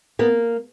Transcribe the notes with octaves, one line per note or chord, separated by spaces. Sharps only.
A#3 B3